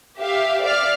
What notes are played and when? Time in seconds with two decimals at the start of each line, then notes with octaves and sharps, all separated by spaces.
0.19 G4 E5 F5
0.64 D5 E5 F5 F6